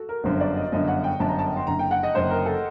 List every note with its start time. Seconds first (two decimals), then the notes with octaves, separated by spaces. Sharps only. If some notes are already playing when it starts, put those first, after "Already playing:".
Already playing: F#4 A4
0.09 A#4
0.24 G1 F#2 D3 C5
0.40 D5
0.57 D#5
0.72 G1 F#2 D3 D#5
0.88 F#5
1.04 G5
1.20 G1 F#2 D3 A5
1.29 A#5
1.39 A5
1.57 C6
1.67 F#1 F#2 D3 A#5
1.79 G5
1.91 F#5
2.03 D#5
2.14 F#1 F#2 D3 C5
2.31 A#4
2.46 A4